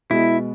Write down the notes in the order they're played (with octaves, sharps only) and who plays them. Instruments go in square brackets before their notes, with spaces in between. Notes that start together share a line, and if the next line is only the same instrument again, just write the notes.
[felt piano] B2 G#3 B3 [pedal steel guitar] E4